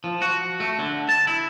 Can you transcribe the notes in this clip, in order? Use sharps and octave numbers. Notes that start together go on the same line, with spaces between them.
F3
F#4
A3
D3
A5
E4